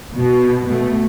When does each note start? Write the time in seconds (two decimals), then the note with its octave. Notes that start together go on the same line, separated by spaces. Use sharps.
0.15 B2
0.66 B2 A3